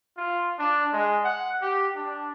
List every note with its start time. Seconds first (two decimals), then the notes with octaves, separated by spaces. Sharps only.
0.17 F4
0.59 D4
0.93 G#3
1.25 F#5
1.62 G4
1.95 D4